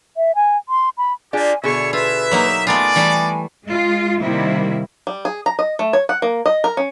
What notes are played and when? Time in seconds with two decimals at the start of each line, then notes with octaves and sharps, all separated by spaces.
0.17 E5
0.35 G#5
0.69 C6
0.98 B5
1.33 A#3 D4 F4 G4 G#4 G#5
1.64 B2 D3 G#4 C#5 E5 G#5 C#6
1.93 F4 B4 E5
2.31 F#3 A#3 D#4
2.67 G#3 A3 B3 F4 D5 G#5
2.96 E3 G3 A3
3.66 G#3 F4
4.21 C3 D#3 G3 A#3 E4
5.07 G3
5.25 G#4
5.46 A#5
5.59 D#5
5.79 A3
5.93 C#5
6.09 F#5
6.22 A#3
6.46 D#5
6.64 A#4
6.77 C#4